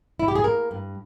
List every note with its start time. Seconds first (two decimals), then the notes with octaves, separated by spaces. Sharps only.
0.19 E4
0.28 G4
0.35 G#4
0.44 A#3 A#4
0.71 G2